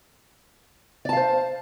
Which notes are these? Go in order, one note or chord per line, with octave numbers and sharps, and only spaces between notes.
C5 D5 F5 A5